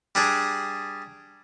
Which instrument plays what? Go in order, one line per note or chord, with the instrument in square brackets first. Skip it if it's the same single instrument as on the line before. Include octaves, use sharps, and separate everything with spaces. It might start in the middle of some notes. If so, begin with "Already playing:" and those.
[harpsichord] G3 D4 G#4